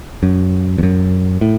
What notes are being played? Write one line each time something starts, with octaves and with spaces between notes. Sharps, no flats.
F#2
E2
F#2
A2